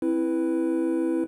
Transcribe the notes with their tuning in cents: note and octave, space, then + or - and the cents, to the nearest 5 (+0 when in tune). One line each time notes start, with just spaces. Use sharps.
C4 +10 E4 +0 B4 +0